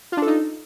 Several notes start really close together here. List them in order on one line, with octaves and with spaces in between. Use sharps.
F4 D4 A4 D#4